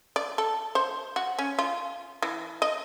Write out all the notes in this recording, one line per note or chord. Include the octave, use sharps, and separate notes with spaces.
D5
A4
C5
F#4
C#4
F4
E3
D#5